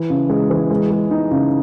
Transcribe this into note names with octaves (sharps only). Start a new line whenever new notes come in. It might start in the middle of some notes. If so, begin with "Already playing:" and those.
Already playing: E3
C#3
G#3
E3
G#3
G#3
D#4
C#3